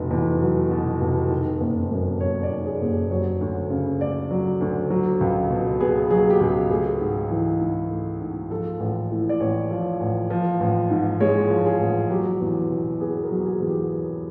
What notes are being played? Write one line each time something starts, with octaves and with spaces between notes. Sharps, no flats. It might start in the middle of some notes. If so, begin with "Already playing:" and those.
Already playing: F1 B2
E2
F#3
B2
F1
D#3
F#1
F#2
F#1 C#5
D5
D#3
G#4
F#1
G4
F#3 C#5
D2
C#3
A3 D5
F#3
D2
F#3
C#2
B2
B3 G#4
F#3 G#4
G4
C#2 G#4
A3 G#4
G#2
E3
G#2
A3
G#2
F3 A4
A1
A2
D5
A1 C#5
F3
A1
F3
A1
G#2
G#3 C#5
F3
G#4
A1
F#3 G4
E2
B2
B3 G#4
A#4
F#3
G#4
E2
G4